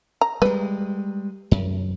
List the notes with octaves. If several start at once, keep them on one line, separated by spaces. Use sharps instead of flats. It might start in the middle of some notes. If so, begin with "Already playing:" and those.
A#5
G3 G#3 B4
F#2